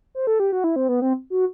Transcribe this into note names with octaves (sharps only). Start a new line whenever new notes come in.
C5
A4
G4
F#4
E4
C4
B3
C4
F#4